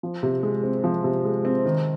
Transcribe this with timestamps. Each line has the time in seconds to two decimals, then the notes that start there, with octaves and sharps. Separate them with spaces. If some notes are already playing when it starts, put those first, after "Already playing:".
0.03 F3
0.23 C3
0.43 G#3
0.64 C4
0.84 F3
1.04 C3
1.25 G#3
1.45 C4
1.65 D#3